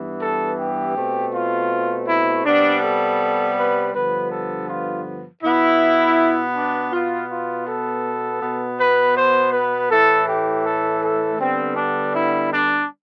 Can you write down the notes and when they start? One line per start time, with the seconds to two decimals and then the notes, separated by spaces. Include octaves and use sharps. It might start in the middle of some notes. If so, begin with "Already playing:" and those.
Already playing: G2 E3 B3
0.21 A4
0.59 G4
0.96 B2 A3 C4
1.34 F4
2.07 E4
2.45 C3 G3 B3 D4
2.83 A4
3.57 B4
3.93 G2 D3 F3 B3 B4
4.31 A4
4.68 F4
5.43 B2 B3 E4
6.55 D4
6.92 B2 B3 F4
7.29 F4
7.67 A4
8.42 B2 B3
8.79 B4
9.16 C5
9.53 B4
9.91 A2 E3 A3 A4
10.28 G4
10.65 A4
11.03 A4
11.39 D3 G3 B3 C4
11.76 D4
12.14 E4
12.52 D4